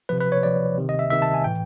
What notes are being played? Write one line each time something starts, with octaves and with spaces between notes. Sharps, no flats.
C3 F3 B4
B4
C#5
C3 F3 D5
C3 D#3
D#5
E5
C3 D#3 E5
A5
G#5
A2 E3 G5